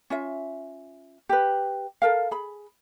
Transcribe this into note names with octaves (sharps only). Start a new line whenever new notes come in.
C#4 F4 E5
G4 B4
A4 A#4 F5
G#4 B5